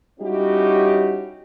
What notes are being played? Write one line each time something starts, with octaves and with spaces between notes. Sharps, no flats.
G3 C#4 D#4 E4 F#4 G4